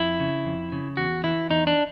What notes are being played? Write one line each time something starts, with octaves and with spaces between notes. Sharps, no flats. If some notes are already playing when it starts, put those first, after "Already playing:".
Already playing: F2 E4
C#3
F2
C#3
E2 F#4
E3 E4
E2 D#4
D4